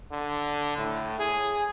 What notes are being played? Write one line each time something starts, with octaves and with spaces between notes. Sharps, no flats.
D3
A2
G#4